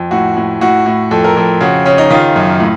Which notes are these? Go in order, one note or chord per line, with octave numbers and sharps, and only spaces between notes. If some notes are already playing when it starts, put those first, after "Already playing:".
Already playing: F2
A2 F#4
A2
A2 F#4
A2
F2 A4
A#4
F2 A4
C#3 F#4
C#3 C#4
D#4
D#3 F4
F#2
A2